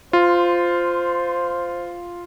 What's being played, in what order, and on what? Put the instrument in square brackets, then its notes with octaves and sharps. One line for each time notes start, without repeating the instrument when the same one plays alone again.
[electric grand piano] F4 [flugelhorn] C5